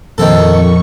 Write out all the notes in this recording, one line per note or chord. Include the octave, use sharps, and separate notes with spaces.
F2 A#2 D#3 F3 C4 A4 C#6